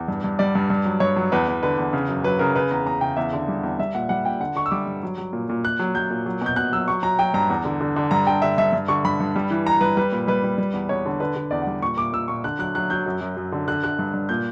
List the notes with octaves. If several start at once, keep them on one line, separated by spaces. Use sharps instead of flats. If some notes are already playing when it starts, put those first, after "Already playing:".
Already playing: E2
G2
G2
G3 D5
G2
G2
F#3
G2 C#5
F#3
E2 B4
E2
D3 B4
E2
C#3
F#2
F#3 B4
C#3 A#4
C#3 B4
E2 A#5
E2 A#5
C#3 G5
E2 E5
D3
G3
E2
G3 E5
A#2 F#5
G3 F#5
A#2 G5
D3 F#5
D3 C#6
E6
G3 D6
G2
F#3
F#3
A#2
A#2
A#2 F#6
F#3
F#3 G6
A#2
F#3
B2 G6
B2 F#6
F#3 E6
F#3 C#6
F#3 A#5
F#3 G5
G2 A#5
E2
D3
D3
D3
G2 A#5
D3 G5
D3 E5
G2 E5
G2
D3 C#6
G2 B5
G2
G3
E3
E3 A#5
G2 B4
G3 B4
A#2
G3 B4
G3
G3
E2
E2 C#5
D3
D3 B4
D3
E2 D5
G3 F#5
A#2 C#6
A#2 D6
A#2 E6
A#2 C#6
D3 F#6
F#3 F#6
F#3 F#6
F#3 G6
F#2
F#2
F#2
D3
D3 F#6
D3 F#6
G2
G2
A#2 G6